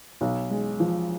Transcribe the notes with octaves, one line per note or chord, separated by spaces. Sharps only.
B1
G#3
F3